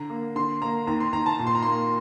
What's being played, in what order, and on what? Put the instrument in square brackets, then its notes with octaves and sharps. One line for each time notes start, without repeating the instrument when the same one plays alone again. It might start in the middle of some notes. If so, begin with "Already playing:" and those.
Already playing: [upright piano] D3 A#5
A#3
D3 C6
A#3 A#5
D#2 A#5
C6
D#2 A#5
A5
A#2
C6
A#5
A#3 C6